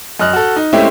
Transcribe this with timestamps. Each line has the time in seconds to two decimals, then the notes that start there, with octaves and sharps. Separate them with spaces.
0.20 F#2 D#5 F6 F#6
0.33 F#4 A4
0.56 D#4
0.73 G#3 A3 C4 C#4 E4 G4